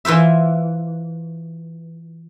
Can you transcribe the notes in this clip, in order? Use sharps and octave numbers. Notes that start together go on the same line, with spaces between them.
E3 F4 C5 E5